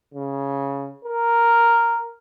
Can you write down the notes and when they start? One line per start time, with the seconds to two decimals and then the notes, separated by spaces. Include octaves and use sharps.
0.14 C#3
1.05 A#4